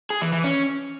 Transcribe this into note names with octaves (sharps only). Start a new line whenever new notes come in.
G#4
E3
E3
C#4